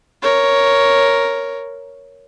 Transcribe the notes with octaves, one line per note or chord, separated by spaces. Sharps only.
A#4 C#5